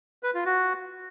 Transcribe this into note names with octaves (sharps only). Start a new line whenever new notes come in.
B4
F4
F#4